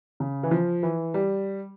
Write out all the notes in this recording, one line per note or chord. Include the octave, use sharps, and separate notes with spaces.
C#3
E3
F3
E3
G3